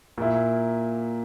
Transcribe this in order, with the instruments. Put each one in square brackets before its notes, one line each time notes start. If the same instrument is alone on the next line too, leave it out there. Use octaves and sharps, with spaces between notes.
[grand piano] A#2 A#3 E4